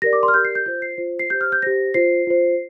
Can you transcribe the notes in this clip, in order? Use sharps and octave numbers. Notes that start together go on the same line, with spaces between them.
G4 A#4 D5 A#6
D6
C6
F6
G4 A#4 D5 G6
C7
G6
F4 C5 G6
C7
F4 C5
C7
G4 C5 G6
F6
G6
G4 C5 A#6
F4 C5 C7
F4 C5